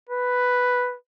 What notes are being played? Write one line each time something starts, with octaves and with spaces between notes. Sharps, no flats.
B4